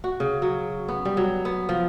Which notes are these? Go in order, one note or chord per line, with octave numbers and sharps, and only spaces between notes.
F#4
C#3
F#3
B3
G3
F#3
B3
F3